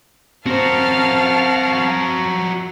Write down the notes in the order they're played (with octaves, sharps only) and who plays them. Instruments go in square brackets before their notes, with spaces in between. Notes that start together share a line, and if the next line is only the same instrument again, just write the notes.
[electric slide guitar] C4 C5 [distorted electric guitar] F#4 A#4 [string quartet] F5 A5